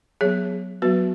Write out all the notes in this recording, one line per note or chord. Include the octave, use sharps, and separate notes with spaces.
F#3 B3 G#4 C#5
F#3 B3 F#4 B4